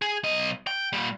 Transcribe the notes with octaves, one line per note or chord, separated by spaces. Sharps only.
G#4
B1 D#5
G5
A#2 G3